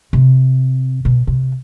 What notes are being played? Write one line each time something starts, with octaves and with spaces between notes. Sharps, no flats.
C3
B2
C3